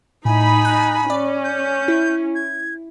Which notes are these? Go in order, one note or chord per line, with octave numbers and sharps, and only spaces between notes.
A2 D#4 G#5 B5
F#6
C#4 D5
G6
E4
G#6